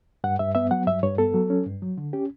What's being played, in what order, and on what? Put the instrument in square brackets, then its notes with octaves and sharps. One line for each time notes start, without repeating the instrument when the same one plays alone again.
[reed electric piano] G2 F#5
G2 E5
B3 E5
F#3 F#5
G2 E5
G2 C#5
B3 A4
F#3
C#4
G2
F#3
D3
C#4 G4